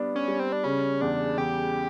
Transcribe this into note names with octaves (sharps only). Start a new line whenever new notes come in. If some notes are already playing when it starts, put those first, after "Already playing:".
Already playing: G3 B3 D4
C#4
G3
C4
D4
C#3 C#4
E2 D4
E2 G4